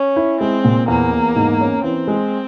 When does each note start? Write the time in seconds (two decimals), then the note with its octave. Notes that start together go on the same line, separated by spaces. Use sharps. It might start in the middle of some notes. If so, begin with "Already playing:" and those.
Already playing: C#4
0.16 E4
0.41 G#3 C4
0.64 A#2
0.88 E2 A#3
1.13 E2
1.36 G#2
1.61 C#4
1.84 E3 C4
2.08 G#3